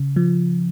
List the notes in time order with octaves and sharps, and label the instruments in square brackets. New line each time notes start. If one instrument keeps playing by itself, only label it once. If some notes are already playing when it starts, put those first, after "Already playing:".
Already playing: [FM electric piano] C#3
F3